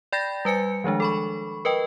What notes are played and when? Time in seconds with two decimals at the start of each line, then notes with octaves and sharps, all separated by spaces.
0.12 D5 G5 B5 G6 A6 A#6
0.45 G3 B4 G#5 C#7
0.84 D#3 F3 G#3 D4
1.00 A4 B5 C#6
1.65 A#4 B4 D#5 G5